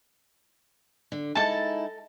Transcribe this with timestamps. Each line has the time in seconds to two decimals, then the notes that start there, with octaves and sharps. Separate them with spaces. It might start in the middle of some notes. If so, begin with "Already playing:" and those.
1.12 D3
1.35 G#3 D#4 E4 A4 A5